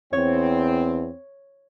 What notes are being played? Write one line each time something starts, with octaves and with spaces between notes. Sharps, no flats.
E2 C4 C#5